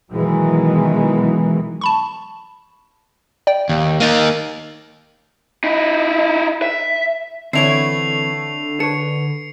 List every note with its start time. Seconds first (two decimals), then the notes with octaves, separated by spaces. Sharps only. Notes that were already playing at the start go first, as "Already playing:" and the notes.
0.11 B2 D#3 E3 F#3 G#3
1.81 A5 B5 C#6
3.47 D5 G5
3.69 D#2
4.00 A#3 D#4 A6 D#7
5.64 D#4 E4
6.62 E5
7.53 D3 E3 A3 C4 E4 C#5 C7 F7
8.80 A4 B4 C#5 C#7